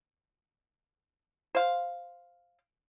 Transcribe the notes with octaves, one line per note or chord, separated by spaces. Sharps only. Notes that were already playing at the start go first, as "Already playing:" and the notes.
C5 F5